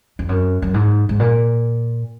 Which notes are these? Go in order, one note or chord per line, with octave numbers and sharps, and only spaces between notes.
F2
F#2
F#2
G#2
G#2
A#2